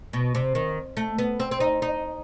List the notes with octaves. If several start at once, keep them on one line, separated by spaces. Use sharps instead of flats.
B2
C3
D#3
A3
B3
C4
C4
D#4
D#4